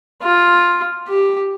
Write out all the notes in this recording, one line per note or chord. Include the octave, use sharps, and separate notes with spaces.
F4
G4